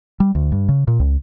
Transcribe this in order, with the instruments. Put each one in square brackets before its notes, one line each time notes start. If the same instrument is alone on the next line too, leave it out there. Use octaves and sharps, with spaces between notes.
[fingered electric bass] G3
D2
G2
C#3
A#2
C#2